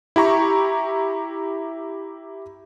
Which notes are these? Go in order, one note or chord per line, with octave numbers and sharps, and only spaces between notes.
E4 G4 A#5 C#6